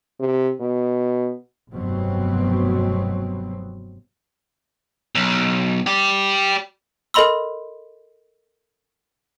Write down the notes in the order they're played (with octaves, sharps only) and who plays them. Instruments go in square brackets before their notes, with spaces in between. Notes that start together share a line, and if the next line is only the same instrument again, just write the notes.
[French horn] C3
B2
[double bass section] F1 G2 B2 F#3 B3 C4
[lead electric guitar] B1
G4 D5
[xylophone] A4 A#4 D#5 B5 C6 E6